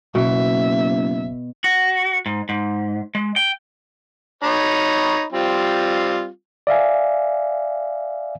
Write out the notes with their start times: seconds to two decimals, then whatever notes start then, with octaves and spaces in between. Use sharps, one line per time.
0.15 F#1 B2 E5
1.64 F#4
2.26 G#2
2.49 G#2
3.15 G#3
3.36 G5
4.43 D#4 C#5 B5
5.33 G3 C4 F4
6.67 D5 E5 F5 G#5